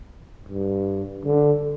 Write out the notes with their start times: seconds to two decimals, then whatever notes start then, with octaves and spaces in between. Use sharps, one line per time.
0.49 G2
1.25 D3